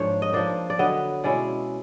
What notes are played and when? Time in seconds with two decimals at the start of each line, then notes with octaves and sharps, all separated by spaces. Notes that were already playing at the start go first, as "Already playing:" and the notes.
Already playing: G#2 F3 A#3 D4 C#5
0.22 D#5
0.33 F3 A#3 D4 D5
0.70 D5
0.79 D3 F#3 B3 D#5
1.24 B2 G#3 C#4 E4 D5